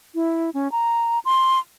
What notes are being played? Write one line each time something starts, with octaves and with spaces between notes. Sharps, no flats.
E4
C#4
A#5
C6